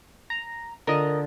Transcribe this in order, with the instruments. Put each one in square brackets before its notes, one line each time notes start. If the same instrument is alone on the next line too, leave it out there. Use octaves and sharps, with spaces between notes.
[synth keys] A#5
[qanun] D3 F4 [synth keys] A#4 D#5